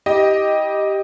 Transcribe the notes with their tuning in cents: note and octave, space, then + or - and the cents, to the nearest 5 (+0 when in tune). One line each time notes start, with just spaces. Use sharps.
E4 -35 G4 +0 D#5 +0